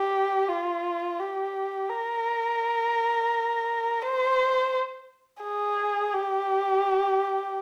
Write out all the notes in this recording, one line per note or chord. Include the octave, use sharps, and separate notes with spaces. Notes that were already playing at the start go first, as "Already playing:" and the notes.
Already playing: G4
F4
G4
A#4
C5
G#4
G4